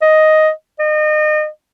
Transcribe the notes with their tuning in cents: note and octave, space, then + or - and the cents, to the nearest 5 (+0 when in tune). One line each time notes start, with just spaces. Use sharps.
D#5 +5
D#5 -30